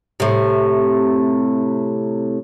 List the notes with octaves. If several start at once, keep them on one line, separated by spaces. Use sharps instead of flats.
A2 C3